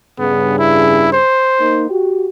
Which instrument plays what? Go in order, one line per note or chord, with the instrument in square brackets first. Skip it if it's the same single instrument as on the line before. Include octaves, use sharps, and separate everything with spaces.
[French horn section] G2 C#3 G#4 [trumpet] B3
[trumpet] E4
C5
[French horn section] A#3 D#4
F#4 G4